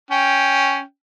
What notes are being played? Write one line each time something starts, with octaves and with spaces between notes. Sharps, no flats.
C#4 G5